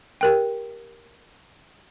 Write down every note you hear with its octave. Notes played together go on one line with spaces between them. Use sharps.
G4 A#4 G5